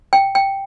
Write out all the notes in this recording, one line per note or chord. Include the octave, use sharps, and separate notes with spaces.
G5
G5